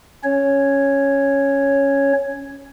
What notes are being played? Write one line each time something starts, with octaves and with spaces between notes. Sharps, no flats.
C#4 C#5